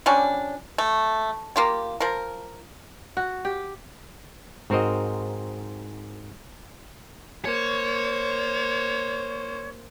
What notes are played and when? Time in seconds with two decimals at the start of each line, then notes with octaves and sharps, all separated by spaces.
0.06 F3 G3 C#4 D4
0.78 A3
1.56 A#3 F4 G4
2.00 F3 A#4
3.17 F#4
3.45 G4
4.70 G#2 C4 F#4 A#4 C5 D#5
7.45 A#3 C5 C#5